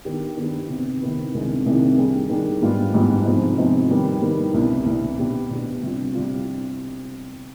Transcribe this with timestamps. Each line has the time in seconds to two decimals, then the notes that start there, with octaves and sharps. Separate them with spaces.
0.05 D#3 B3 D4 G4
0.38 D#3 B3 D4 G4
0.69 C3 D#3 B3
1.01 C3 D#3 B3
1.34 C2 C3 D#3 G#3 D4
1.66 C2 C3 D#3 G#3 D4
1.98 D#3 G3 D4 G#4
2.30 D#3 G3 D4 G#4
2.62 G#2 G3 B3 D4 F4
2.94 G#2 G3 B3 D4 F4
3.26 C3 F3 G#3 B3 D#4
3.58 C3 F3 G#3 B3 D#4
3.90 D#3 G3 B3
4.22 D#3 G3 B3
4.54 C2 B2 B3 D4
4.86 C2 B2 B3 D4
5.18 B2 B3 D4 G4
5.50 B2 B3 D4 G4
5.82 C3 G3 D4 F4
6.15 C3 G3 D4 F4